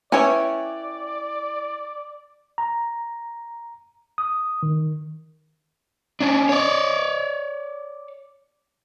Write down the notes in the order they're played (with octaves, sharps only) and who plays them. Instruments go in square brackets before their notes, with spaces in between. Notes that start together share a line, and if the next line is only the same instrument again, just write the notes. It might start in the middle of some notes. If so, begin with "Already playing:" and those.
[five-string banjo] C#4 C#5 [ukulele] E4 B4 G5 [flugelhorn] D5
[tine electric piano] A#5
D#6
D#3
[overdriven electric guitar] C#4 D4
C#5 D5